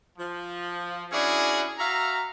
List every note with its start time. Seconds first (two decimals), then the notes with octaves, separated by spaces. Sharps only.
0.18 F3
1.12 C#4 D4 E4 F#4 G#4
1.79 F#4 E5 F5 A#5